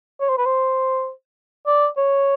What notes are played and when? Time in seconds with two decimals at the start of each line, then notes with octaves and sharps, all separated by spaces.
0.21 C#5
0.29 C5
0.38 B4
0.46 C5
1.67 D5
1.97 C#5